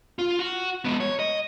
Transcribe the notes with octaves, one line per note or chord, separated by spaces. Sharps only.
F4
F#4
G#3 B3
C#5
D#5